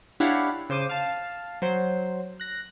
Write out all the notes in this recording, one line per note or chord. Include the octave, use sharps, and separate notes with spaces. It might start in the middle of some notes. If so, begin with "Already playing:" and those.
D4 E4 G4 C#5 F5 F#5
C#3 C5 D6 D#7
F5 A5
F#3 C5
F#6 A#6